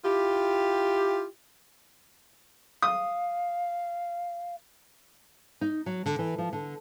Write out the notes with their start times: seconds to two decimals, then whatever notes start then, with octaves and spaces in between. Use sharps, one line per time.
0.05 E4 F4 G4
2.82 F5 D#6
5.61 D#4
5.86 F#3
6.06 D3
6.19 E3
6.38 F3
6.53 D3